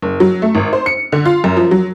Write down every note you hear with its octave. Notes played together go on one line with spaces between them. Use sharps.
F#1
F#3
A3
G#1
C5
C#7
D3
F4
F#2
F3
F#3